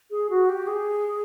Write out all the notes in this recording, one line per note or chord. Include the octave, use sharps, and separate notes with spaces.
G#4
F#4
G4
G#4